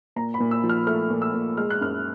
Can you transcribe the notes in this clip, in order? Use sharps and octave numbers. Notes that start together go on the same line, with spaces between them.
A#2 A#5
B5
A#2
E6
F3
F6
A3 F6
A#2
E6
A#2
G#3 F6
F#6
F#2 F6